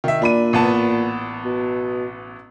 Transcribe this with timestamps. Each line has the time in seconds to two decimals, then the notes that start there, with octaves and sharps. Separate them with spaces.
0.04 D#3 E5
0.22 A#2 D4 B5 D#7
0.53 A1 B3 A5
1.45 B2